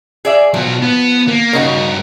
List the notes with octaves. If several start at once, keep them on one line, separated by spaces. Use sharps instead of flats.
G#4 D5 E5
B2 F3 F#3
B3
A#3
G2 C#3 D#4 F#4 A#4